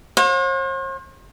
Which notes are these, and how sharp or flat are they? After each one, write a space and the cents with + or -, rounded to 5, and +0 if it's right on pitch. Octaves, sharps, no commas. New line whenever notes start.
C5 +45 F#5 -45